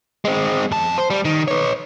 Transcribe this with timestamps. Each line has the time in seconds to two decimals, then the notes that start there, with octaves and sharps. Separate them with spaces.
0.25 G#3 C4
0.72 F2 A5
0.98 C5
1.10 G3
1.25 D#3
1.48 B4 C#5